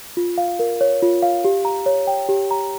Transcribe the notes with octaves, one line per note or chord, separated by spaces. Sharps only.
F4
F5
A#4
C#5
F4
F5
G4
A#5
C#5
G5
G4
A#5